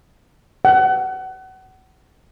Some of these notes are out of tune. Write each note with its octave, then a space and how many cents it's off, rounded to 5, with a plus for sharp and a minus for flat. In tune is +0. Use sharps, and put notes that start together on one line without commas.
F#5 +30